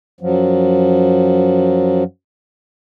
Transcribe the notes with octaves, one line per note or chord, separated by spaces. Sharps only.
F#2 F3 F#3